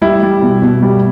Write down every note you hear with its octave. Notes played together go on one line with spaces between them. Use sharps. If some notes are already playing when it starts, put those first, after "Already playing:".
G3 E4
G3
B2
B2
G3